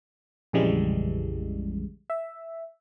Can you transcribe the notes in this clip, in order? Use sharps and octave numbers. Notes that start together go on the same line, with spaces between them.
A#1 F2 C#3 E3 G3 G#3
E5